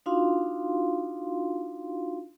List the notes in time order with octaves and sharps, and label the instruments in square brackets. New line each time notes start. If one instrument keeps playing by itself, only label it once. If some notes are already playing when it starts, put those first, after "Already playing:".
[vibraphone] D4 D#4 F4 F#4 F5 C6